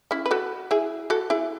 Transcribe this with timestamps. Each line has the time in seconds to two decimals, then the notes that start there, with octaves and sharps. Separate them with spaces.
0.11 C#4 E4
0.26 B4
0.31 F#4 A4
0.71 E4 G#4
1.10 F#4 A4
1.30 E4 G#4